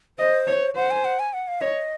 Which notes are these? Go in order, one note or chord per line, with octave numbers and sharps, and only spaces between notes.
C5 D#5
C#5
C5 F#5
G#5
F#5
G#5
F#5
F5
C#5 D#5